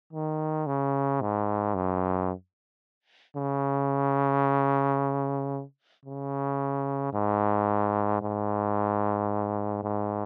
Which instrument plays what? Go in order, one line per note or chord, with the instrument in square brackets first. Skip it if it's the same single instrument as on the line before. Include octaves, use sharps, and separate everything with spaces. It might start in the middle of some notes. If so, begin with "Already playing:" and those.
[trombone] D#3
C#3
G#2
F#2
C#3
C#3
G#2
G#2
G#2